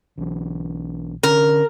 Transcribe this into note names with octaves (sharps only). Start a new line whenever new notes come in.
B1 E3
D3 C#4 A#4